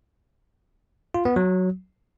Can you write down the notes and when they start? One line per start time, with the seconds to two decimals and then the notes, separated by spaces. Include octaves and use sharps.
1.14 F4
1.25 B3
1.36 F#3